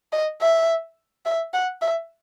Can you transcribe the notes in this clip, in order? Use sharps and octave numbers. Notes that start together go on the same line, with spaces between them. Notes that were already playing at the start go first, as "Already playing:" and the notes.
D#5
E5
E5
F#5
E5